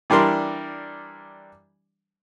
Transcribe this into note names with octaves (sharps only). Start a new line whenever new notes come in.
E3 G3 D4 A#4 C6